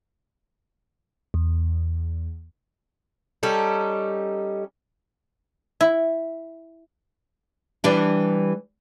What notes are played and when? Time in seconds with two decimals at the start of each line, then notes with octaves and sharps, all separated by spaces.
1.34 E2
3.43 G3 C#4 D#4 A4
5.81 E4
7.84 E3 G3 D4